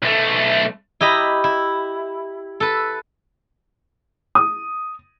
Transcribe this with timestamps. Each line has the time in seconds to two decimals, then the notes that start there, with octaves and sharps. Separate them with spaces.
0.02 B1 A3
1.01 E4 G4 D#5 A#5 B5
1.44 E4
2.60 A4 B4
4.35 D#6